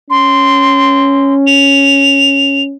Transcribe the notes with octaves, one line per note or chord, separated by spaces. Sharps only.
C#4 C6
F7